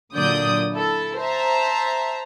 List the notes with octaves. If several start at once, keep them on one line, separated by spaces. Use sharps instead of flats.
A#2 D3 F#3 D5 D#6 G6
E4 A4
C5 E5 A5 A#5